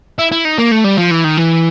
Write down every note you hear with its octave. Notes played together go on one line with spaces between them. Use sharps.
E4
E4
D#4
A#3
A3
G3
F3
E3
D#3
E3